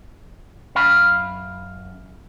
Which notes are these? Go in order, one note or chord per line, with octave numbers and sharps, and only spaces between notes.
F#2 F5 B5